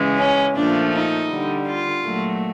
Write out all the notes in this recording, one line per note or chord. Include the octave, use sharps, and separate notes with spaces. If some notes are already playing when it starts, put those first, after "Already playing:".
Already playing: C#3 E3 G#3
C#4
A#2 F3 A3 D4
D#4
D3 G3
F4
A#2 F#3 A3